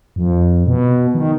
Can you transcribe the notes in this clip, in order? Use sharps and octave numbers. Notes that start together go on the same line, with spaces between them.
F2
B2
D#3